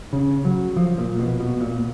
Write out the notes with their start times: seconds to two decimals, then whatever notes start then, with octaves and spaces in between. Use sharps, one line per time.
0.13 C#3
0.45 F#3
0.76 F3
0.98 A#2
1.19 B2
1.40 B2
1.61 A#2